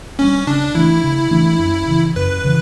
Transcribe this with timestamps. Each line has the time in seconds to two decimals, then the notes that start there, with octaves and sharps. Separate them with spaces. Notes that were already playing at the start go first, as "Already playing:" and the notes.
0.19 G3 B3 C#4 D4
0.47 C#3 D4
0.74 E3 A3 D4 E4
1.04 C#3
1.31 E3 A3 D4
1.59 F#2
1.87 C#3 E3
2.16 F#2 B4
2.44 C#3 E3